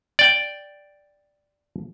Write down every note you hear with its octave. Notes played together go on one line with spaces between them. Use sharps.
D5 G5